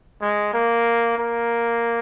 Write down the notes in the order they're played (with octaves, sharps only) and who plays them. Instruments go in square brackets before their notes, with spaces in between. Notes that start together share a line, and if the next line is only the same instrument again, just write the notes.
[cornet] G#3
A#3
A#3